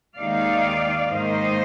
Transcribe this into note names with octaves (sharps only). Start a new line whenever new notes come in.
D#2 D#3 G#3 D#4 D5 F5
G#2 D#3 A#3 D#4 C5 D#5